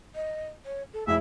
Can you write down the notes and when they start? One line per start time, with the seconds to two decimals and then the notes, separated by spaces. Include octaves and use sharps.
0.15 D#5
0.66 C#5
0.93 A4
1.07 F1 E4 G#4 E5